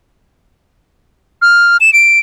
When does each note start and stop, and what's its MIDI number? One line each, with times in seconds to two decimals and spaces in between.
1.42 1.77 89
1.81 1.93 100
1.93 2.19 98